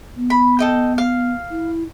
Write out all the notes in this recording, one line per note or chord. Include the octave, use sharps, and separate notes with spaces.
B3
B5
A4 D#5 G5
F5
E4